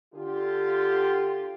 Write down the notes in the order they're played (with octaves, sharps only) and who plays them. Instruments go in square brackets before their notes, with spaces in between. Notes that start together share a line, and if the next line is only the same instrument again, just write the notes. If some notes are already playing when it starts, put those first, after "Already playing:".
[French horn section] D3 F4 G4